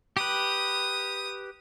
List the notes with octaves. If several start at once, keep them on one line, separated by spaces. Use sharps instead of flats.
G4 B4 D#6